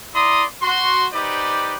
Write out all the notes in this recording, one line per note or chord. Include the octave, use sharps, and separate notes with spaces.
E4 D5 A#5 C6 D#6
F#4 C6
D#4 G4 B4 C5 D5